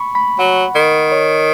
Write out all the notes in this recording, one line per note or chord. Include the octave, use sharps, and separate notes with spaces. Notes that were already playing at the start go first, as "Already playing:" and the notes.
Already playing: B5 C#6
B5
F#3 F#5
D#3
C#5